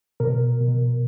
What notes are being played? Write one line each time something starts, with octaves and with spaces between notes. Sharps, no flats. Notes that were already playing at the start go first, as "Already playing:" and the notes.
B2 A#4
B2